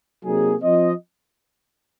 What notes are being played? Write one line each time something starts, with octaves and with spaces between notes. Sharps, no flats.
C3 F#3 A#3 D#4 G#4
F3 C4 F4 C5 D#5